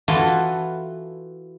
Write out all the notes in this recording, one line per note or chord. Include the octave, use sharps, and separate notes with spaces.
E3 F4 F#4 A4 B4